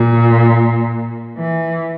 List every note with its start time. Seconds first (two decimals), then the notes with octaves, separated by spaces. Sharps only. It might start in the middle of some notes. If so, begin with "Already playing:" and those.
Already playing: A#2
1.37 E3